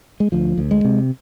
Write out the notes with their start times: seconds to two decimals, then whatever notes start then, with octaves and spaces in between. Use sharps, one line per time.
0.20 G#3
0.32 D2 F3
0.58 D2
0.71 G#3
0.85 C3